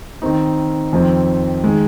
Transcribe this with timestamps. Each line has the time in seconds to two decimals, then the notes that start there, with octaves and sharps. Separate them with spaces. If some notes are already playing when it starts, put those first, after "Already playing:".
0.22 D#3 C4 D#4
0.93 F2 D#3 C4
1.64 D#3 G#3